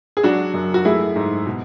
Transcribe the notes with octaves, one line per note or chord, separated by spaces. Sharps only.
G#4
F#3 D4 F#4
F#2
F#4
A3 E4 G#4
G#2
B2